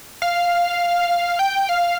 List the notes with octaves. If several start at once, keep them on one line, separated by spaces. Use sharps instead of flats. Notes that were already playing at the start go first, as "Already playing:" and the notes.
F5
G5
F5